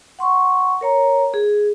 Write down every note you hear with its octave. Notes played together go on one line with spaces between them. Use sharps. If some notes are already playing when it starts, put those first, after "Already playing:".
F#5 C6 C#6
A#4 C#5 A#5
G#4